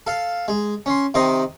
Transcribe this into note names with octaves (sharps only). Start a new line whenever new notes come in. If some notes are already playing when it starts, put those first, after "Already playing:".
A4 F5
G#3
C#4 C6
C3 D#3 D#5 C6